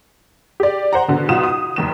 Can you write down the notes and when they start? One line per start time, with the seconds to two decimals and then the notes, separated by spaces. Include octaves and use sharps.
0.60 G4 D5
0.93 C5 F#5 A#5
1.08 B2 D3
1.29 B1 B2 F4 F#5 D#6 E7
1.43 D#6
1.76 F1 D#2 E7